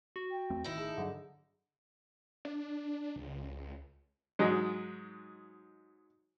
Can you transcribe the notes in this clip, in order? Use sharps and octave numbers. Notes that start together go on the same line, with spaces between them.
F#4
G5
E2 A3 C4
A1 A2 D#3 D#4 E4
G#4 A5
G2 D3 F#3 D4
D4
C#2
G#2 F#3 G#3